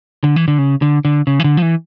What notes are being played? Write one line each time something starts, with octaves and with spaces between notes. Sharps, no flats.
D3
E3
D3
C#3
D3
D3
C#3
E3
D3
F3
E3